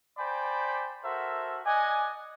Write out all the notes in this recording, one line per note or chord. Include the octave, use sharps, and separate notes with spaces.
C5 D5 G5 G#5 B5
F#4 A4 A#4 C5 E5
D5 D#5 F#5 G#5